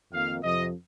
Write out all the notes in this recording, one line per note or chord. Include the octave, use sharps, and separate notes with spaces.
F2 D#3 A#3 F5
F2 C3 F3 D#5